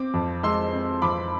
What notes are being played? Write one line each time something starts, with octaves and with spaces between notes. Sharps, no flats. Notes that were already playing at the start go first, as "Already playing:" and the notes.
Already playing: C4 D6
F2
G#3 C6 E6
C4
F2 B5 D6